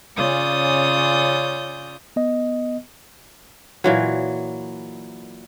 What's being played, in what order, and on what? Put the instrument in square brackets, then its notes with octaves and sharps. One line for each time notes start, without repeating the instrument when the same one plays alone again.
[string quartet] C#3 C#4 F4 D5 D#6 G6
[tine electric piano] B3 D#5
[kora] A#2 E3 F#3